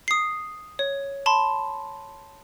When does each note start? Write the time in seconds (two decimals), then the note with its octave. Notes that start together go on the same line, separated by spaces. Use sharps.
0.08 D#6 C7
0.79 C#5
1.26 A5 B5 C6